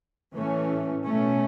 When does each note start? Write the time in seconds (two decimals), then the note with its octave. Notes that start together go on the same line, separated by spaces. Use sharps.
0.34 A2 E3 A3 C#4
1.04 B2 A3 C#4